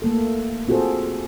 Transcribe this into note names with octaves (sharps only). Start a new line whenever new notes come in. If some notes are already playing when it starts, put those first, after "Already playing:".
A3 A#3 A4
C4 F4 F#4 G#4 A4 C5